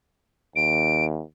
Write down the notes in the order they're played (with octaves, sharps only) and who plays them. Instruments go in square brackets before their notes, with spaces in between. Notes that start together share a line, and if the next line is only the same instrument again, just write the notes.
[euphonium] D#2 [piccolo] D7